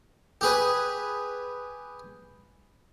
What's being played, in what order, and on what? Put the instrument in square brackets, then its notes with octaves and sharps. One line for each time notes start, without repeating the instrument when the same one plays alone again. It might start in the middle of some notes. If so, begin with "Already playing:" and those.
[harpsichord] G4 G#4 B4